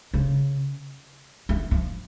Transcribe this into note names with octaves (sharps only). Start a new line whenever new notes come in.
C#3
E3
F3